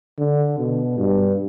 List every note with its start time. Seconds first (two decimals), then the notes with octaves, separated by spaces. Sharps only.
0.18 D3
0.58 B2
0.98 G2